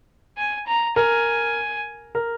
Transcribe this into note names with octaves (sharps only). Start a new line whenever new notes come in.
G#5
A#5
A#4 G#5
A#4